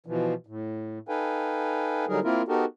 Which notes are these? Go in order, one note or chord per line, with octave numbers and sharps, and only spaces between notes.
B2 E3 F3
A2
D#4 A4 B4 F5 G5 G#5
D3 F#3 G3 D#4 G#4 A#4
A#3 C4 E4 F4 A#4
B3 D#4 F#4 G4 A4 A#4